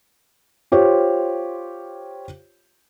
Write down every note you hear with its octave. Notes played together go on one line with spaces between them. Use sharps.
F4 G4 C5 C#5